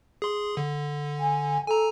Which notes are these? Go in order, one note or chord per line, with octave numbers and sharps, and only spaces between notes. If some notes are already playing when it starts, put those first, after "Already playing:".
G#4 C6
D3
G#5
A4 G#5 A#5